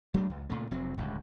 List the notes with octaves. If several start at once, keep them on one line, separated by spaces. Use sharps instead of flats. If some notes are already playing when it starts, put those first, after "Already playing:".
F#3 G#3 A3 D4
C#2
A#2 C#3 A3
F1 F#3 C4
D1 C#2 G2